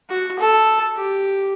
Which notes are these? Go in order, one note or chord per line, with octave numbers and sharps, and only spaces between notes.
F#4
A4
G4